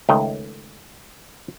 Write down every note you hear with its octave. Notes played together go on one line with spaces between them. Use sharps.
C#2 D#3 A3 G5